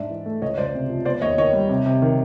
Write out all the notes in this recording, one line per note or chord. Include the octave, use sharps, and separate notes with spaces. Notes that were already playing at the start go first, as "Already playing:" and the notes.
Already playing: G#2 D4 D5 E5
E3
A3
C#2 C#5 D#5
C#2 C5 D5
C3
F3
B3 C5 D5
D#2 C#5 D#5
D#3 C#5 D#5
G3
C3
C3
D#3